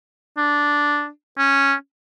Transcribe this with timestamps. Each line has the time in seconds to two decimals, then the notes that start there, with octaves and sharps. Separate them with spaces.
0.37 D4
1.38 C#4